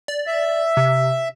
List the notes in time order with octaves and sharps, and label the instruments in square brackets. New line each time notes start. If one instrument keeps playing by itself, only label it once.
[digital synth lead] D5
[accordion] E5
[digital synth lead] C3